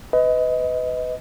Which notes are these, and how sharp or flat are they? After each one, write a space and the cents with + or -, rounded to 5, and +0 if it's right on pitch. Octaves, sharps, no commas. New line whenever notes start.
B4 +25 D#5 +20